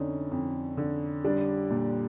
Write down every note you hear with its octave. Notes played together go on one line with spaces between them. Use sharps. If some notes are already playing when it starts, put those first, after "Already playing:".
Already playing: F2 D3 C#4 D#4
F2
D3
G3 D4
A#2